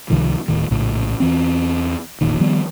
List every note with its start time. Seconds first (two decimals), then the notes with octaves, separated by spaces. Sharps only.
0.10 C#2 C3 D#3 F3
0.48 D1 A2 D#3
0.71 A#1 A2 C#3
1.20 E2 E3 C4
2.21 E1 A1 A#2 D#3
2.40 D#3 F3 G3 B3